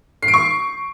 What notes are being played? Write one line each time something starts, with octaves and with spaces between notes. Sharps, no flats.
C7
D7
C#6